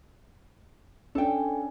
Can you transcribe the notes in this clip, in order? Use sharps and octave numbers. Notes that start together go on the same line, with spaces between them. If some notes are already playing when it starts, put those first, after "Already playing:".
C#4 D4 A4 G5